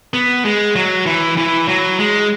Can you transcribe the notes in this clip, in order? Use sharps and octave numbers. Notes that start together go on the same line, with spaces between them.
B3
G#3
F#3
E3
E3
F#3
G#3